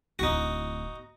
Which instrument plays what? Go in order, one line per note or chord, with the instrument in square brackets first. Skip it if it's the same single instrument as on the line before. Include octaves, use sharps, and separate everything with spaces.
[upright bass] D1 E4 [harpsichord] D#4 F#4